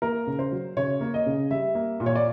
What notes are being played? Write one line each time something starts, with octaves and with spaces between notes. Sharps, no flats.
A#3 A#4
C#3
C5
F#3
C#3 C#5
A#3
D#5
C#3
G3 E5
A#3
A#2
C#5
D5